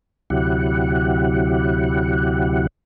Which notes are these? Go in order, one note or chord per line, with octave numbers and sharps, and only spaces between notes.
D2 C3 F#3 E4 G4 F#5